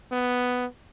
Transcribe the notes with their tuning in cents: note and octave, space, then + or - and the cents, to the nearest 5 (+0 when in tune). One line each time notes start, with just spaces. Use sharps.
B3 +5